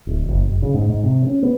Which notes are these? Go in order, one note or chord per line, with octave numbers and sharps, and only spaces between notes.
D1
F#1
F#1
C#3
G#2
G#2
C3
C#4
B3